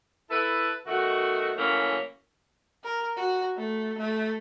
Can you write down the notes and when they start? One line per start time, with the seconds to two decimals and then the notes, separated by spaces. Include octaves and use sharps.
0.30 E4 A4 B4
0.87 B2 D#3 A3 F#4
1.56 C#3 E3 F#3 A3 A#3 C#4
2.84 A#4
3.17 F#4
3.57 A3
3.98 A3